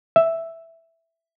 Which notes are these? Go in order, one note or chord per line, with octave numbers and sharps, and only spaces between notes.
E5